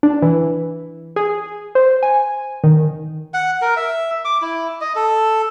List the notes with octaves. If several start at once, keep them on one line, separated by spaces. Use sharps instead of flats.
D4
E3
G#4
C5
G#5
D#3
F#5
A#4
E5
D6
E4
D#5
A4